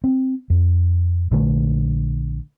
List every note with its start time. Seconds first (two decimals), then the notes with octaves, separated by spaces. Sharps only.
0.04 C4
0.50 F2
1.31 A#1 D3 A3